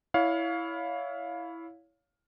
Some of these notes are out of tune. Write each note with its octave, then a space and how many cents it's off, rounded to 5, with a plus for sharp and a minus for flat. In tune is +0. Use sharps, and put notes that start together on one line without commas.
E4 +0 C#5 +25 F5 +15